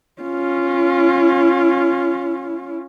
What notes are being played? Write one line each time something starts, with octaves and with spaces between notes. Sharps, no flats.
C#4 F4